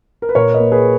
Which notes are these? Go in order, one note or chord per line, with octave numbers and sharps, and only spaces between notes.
A#4
B4
A#2 A#4 C#5
B4 D#5
A#3
G#4 B4